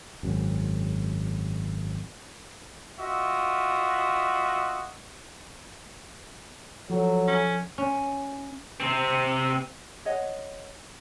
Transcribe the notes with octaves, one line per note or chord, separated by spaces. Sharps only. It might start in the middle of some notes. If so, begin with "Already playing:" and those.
G#1 F#2
F4 F#4 D#5 E5
F3 F#3 A4
C#4
C#4
C3 C4
C#5 D#5 F#5